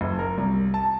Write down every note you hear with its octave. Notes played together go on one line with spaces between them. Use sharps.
F#1
A#4
C2
A5